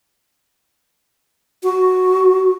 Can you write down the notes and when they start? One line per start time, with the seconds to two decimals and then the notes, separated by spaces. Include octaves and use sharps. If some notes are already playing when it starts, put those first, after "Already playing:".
1.63 F#4